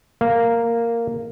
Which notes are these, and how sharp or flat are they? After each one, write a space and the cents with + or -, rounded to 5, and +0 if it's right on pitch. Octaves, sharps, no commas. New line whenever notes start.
A#3 -5